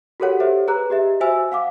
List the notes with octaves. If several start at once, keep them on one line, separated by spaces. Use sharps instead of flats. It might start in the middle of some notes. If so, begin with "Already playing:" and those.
F#4 G4 A4 A#4 C#5 F#5
G4 A4 C5 C#5 E5
G#4 B4 A#5 F#6
G4 D#5 E5
F#4 C5 E5 G#5 E6
F5 F#5 D6